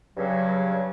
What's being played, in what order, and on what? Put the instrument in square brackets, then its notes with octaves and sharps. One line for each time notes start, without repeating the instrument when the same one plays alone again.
[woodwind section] G2 C#3 F#3